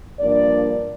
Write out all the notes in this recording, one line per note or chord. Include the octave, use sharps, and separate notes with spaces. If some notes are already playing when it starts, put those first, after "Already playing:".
G2 F3 A#3 D4 D5